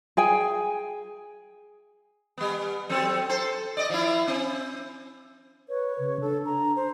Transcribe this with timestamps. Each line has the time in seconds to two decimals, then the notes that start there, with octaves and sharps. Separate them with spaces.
0.17 G#4 G5 G#5
2.38 G3 B3
2.89 F#3 C4 A4
3.29 A4 C5
3.77 D5 D#5
3.90 F3 E4
4.28 C4
5.69 B4 C#5
5.99 C#3
6.21 D4 A4
6.45 A#5
6.76 C5